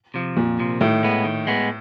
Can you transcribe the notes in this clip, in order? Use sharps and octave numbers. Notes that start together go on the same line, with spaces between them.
C3 F3
F2 A#2
C3 F3
A2 D#3
G#3 B3
D#3
G#3 B3